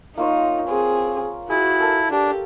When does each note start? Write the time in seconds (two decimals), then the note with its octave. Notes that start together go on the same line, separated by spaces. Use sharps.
0.17 A#3 D#4 F4 C#5
0.68 C4 G#4
1.50 E4 F#4 G#4
1.80 A4 A#4 A5
2.11 D4 G4